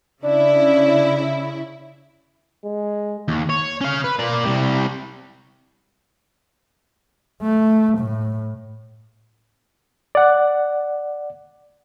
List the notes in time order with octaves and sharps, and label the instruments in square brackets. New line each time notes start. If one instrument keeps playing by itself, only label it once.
[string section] C#3 E4 [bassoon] D4
[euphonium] G#3
[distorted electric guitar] D#2
C#5
C#4 F5
B4
A#3 D5
C2 G3
[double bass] A3
A2
[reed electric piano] D5 F#5